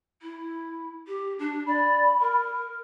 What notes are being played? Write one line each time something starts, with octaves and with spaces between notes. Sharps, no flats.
E4
G4
D4
D5 B5
A#4